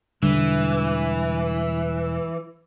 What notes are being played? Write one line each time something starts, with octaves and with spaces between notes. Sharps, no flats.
E1 D3 E3 G3